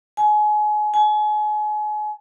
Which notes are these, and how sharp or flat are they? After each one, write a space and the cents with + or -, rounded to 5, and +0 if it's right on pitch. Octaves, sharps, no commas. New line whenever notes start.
G#5 +30
G#5 +35